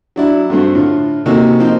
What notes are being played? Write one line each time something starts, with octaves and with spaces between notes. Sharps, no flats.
F#3 D4 E4
G2 A3 C4 F#4
A2 D3 F4
C3 A#3 C#4 D#4 F#4 A4
F3 A#3 C4 D#4